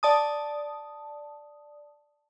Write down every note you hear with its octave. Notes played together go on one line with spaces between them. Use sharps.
D5 A5 D#6